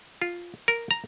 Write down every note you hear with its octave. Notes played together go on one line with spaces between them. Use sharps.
F4
A#4
A#5